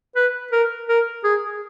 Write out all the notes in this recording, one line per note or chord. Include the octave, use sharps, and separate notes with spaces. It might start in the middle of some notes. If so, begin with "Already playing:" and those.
B4
A#4
A#4
G#4